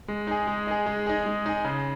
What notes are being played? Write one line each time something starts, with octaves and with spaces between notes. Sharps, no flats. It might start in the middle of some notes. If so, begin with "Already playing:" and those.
G#3
D#4 G#4
G#3
D#4 G#4
G#3
D#4 G#4
G#3
D#4 G#4
C#3